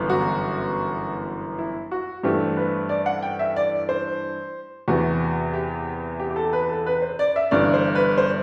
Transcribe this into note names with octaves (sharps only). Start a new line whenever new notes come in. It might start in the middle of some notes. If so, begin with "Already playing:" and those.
Already playing: G1 F#2 E3 B3
F#4
E4
F#4
G2 E3 A3 C4 G4
B4
D5
F#5
G5
E5
D5
C5
E2 C3 E3 B3 F#4
G4
G4
G4
A4
B4
A4
B4
C5
D5
E5
G1 G2 E3 D5
C5
B4
C5